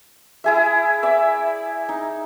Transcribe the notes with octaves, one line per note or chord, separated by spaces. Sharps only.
E4 G#4 E5
D5 E5 E6
D#4